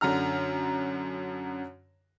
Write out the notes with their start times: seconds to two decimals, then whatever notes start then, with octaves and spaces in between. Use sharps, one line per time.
0.01 F#2 D3 A#5 F6